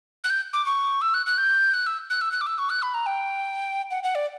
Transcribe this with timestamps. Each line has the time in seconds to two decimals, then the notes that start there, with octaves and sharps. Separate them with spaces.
0.24 F#6
0.30 G6
0.53 D6
0.66 C#6
1.02 E6
1.14 F#6
1.26 F#6
1.38 G6
1.74 F#6
1.87 E6
2.10 F#6
2.21 E6
2.32 F#6
2.41 D6
2.47 E6
2.58 C#6
2.70 F#6
2.82 B5
2.94 A#5
3.06 G5
3.91 F#5
4.03 F#5
4.15 D5